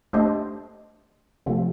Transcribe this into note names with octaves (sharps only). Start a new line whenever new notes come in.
A3 D4 G4 C5 D#5
C3 F3 A3